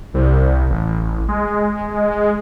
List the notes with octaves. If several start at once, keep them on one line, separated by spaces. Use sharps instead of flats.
C2
A1
G#3